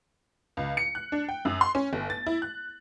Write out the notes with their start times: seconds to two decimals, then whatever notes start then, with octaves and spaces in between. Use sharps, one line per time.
0.57 C#2
0.77 C#7
0.95 F#6
1.12 D4
1.29 G5
1.45 F#2
1.61 C6
1.75 C#4
1.93 G1
2.10 A6
2.26 E4
2.42 F#6